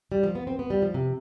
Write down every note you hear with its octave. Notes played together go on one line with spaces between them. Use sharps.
G3
F3
B3
C4
B3
G3
F3
C3